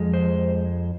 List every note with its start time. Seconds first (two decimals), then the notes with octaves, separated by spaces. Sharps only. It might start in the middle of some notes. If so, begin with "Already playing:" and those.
Already playing: F2 F3 G#3
0.14 C5